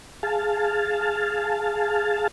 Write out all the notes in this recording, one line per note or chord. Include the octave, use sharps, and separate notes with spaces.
G#4 F5 A5